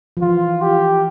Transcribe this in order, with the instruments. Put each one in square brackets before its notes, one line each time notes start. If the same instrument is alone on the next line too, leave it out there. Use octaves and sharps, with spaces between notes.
[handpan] F3
[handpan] E3 [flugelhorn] F4
[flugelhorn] G4